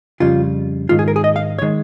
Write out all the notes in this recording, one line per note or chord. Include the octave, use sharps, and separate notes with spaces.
F2 C#3 G3 F4
G#2 D#3 G#3 F4
G#4
A#4
G#4
D#5
F5
C#5
D#3 G#3